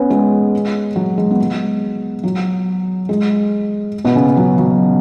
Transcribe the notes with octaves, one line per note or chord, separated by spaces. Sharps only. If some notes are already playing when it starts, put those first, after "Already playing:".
Already playing: B3 C#4 B4 C#5
G#3 G#4
F#3 F#4
G#3
B3
G#3
F#3
G#3
B2 B3
C#3 C#4
F#3
F#3